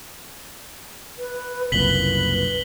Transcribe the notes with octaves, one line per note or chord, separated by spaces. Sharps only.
B4
F#1 C2 A#2 B4 B6 F#7 G7